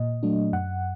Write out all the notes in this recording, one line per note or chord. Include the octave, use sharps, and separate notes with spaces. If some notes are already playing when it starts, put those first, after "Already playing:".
Already playing: A#2 D#5
F#3 A3 D4
F#2 F#5